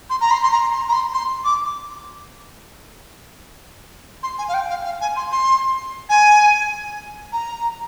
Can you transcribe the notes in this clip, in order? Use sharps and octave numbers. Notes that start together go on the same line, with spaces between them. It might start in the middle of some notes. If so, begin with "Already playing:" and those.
C6
A#5
C6
C6
A#5
C6
A#5
C6
C6
D6
C6
G#5
F5
G5
F5
F5
G#5
C6
C6
G#5
A#5